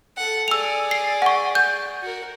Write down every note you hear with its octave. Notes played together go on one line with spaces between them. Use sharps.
A4 F#5
G#4 D5 E6 F7
C7
F#5 C#6
G6
F#4 A#4